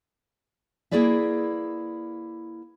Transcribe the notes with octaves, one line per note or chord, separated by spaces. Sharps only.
A#3 E4 G#4 B4 D5 E5